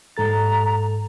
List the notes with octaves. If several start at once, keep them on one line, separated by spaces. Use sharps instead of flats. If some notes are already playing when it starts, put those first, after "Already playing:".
G#2 A4 A#5 A6